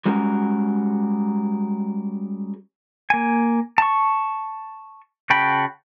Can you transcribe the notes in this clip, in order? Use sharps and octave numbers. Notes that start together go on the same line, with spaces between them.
G3 G#3 C#4 F#4 A#4
A#3 G#5
A5 C#6
C#3 F#4 G5 A5 B5